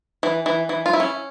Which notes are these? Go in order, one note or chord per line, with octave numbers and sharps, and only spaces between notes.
E3
E3
E3
F4
E4
C#4